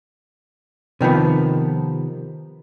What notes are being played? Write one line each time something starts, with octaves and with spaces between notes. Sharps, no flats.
C3 D#3 F3 B3